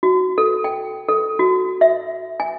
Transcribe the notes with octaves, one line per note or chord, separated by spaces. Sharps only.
F#4
A4
G5
A4
F#4
E5
G#5